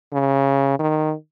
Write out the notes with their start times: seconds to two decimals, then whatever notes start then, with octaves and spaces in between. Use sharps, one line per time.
0.13 C#3
0.79 D#3